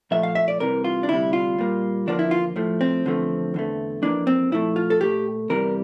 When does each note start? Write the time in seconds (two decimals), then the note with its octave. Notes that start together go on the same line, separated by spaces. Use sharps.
0.11 A#2 F3 A3 E5
0.23 F5
0.35 E5
0.48 D5
0.60 C2 C3 E3 A#4
0.84 F4
1.03 D4
1.09 D2 C3 G3 E4
1.33 F4
1.58 A#2 G3 A#3
2.07 E2 D3 F3 A#3 D4
2.19 E4
2.31 F4
2.56 A2 F3 A3
2.81 C4
3.05 E2 D3 F3 A3
3.54 E2 D3 A3
4.02 F2 E3 A#3 D4
4.27 C4
4.52 A#2 F3 A3 E4
4.76 F4
4.90 A4
5.00 A#2 A3 G4
5.49 E2 C3 E3 G3 A#4